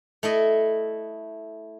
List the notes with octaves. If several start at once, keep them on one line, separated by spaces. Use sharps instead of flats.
A3 E4 D#5